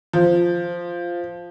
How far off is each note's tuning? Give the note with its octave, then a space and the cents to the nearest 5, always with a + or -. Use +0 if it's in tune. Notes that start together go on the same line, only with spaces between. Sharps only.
F3 -5